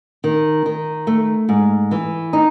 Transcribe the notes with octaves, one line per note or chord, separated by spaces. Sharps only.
D#3
D#3
A3
G#2
E3
D#4